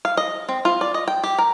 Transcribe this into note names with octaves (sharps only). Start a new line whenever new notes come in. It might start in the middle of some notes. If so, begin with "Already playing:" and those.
F5
D#5
C4
F4
D5
D#5
G5
G4
A#4